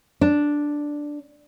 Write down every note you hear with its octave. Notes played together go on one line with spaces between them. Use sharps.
D4